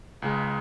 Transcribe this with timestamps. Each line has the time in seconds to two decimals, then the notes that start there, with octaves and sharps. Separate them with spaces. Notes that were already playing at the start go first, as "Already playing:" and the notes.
0.22 C#2 C#3 G#3